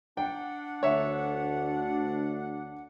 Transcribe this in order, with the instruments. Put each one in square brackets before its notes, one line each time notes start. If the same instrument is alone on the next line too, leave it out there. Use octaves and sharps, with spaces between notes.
[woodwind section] D4 F#5 [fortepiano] G5
[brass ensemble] D2 [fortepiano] C#5 E5